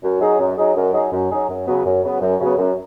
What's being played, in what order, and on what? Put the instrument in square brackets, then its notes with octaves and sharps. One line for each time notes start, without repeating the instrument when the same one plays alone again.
[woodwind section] F#2
F#3 D#4 G#4
F#2
F#3 D#4 G#4
F#2
F#3 D#4 G#4
F#2
F#3 D#4 G#4
F#2
C#3 F#3 B3
F#2
C#3 F#3 B3
F#2
C#3 F#3 B3
F#2